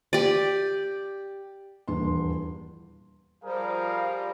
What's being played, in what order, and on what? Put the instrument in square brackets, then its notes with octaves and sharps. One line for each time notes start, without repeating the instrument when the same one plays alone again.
[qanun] G4 D5
[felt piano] D#1 E2 G2 C6
[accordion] F3 G3 [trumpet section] G#4 A#4 F5